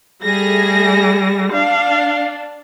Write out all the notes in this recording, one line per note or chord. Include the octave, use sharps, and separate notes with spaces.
G3 A3 G#4 A#6
D4 F5